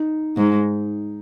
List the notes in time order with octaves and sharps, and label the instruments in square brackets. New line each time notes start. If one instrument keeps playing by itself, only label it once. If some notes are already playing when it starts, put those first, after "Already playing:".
Already playing: [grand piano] D#4
[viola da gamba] G#2